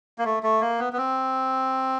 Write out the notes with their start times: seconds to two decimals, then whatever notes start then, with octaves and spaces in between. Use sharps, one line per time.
0.18 A#3
0.25 A3
0.43 A3
0.61 A#3
0.79 B3
0.93 B3
0.98 C4